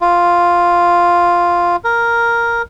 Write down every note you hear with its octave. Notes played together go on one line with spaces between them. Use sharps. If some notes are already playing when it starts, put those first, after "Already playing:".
F4
A#4